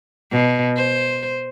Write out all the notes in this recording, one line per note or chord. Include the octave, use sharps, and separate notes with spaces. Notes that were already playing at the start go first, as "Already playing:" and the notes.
B2
C5